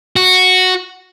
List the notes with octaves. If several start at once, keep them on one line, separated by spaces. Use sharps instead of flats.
F#4